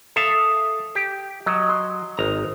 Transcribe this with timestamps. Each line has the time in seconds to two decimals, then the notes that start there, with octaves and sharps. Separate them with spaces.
0.16 A4 E5 F5 D#6
0.95 G4
1.46 F#3 D#5
1.69 C6
2.17 G#1 A#5